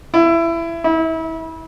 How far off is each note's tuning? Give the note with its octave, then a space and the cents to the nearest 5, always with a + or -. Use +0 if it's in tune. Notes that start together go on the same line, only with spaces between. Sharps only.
E4 +20
E4 -30